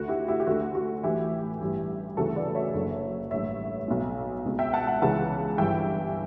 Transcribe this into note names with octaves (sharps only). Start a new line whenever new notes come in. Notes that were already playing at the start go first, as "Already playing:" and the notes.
Already playing: D2 D3 F#4
E4 G4
E4 G4
G4
D2 D3 F#4
F#4
A1 A2 E3 E4 G4
A1 G2 E3
D2 C#3 E3 F#4 A4
B4 D5
C#5 E5
F#1 F#2 D3
A1 G2 D3 C#5 E5
B1 B2
C#2 B2
E5 G5
F#5 A5
F#5 A5
C#2 C#3 E3 F#5 A5
G1 G2 E3 E5 G5